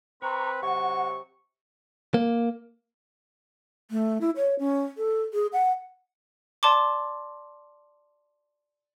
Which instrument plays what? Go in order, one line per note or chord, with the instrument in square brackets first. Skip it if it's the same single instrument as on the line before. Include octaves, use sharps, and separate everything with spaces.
[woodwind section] C4 B4 [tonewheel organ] A#5 C#6
[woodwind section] C3 F#3 C#6 [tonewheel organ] F#5
[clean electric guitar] A#3
[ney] A3
E4
C#5
C#4
A4
G#4
F#5
[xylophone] D5 A5 C6 D6